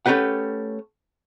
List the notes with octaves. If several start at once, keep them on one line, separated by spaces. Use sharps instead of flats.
A3 C#4 G4 B4 F#5